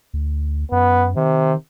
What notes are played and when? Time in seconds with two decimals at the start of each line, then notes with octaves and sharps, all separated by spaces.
0.14 D2
0.72 F#2 B3
1.16 C3 D#3